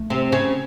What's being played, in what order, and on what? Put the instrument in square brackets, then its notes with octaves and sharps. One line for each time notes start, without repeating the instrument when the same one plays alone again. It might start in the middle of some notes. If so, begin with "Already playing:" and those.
Already playing: [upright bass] A3
[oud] C3 C4
C#3 C#4